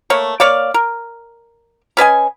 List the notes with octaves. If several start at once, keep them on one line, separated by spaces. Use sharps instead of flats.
A3 A#3 C#5
A#3 C#5 D5 F5
A#4
C#4 B4 D#5 G#5